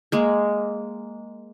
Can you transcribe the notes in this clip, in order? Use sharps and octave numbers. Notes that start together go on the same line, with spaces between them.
G#3 A#3